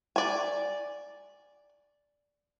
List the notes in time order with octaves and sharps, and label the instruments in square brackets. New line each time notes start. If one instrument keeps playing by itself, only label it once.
[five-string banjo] D5 G#5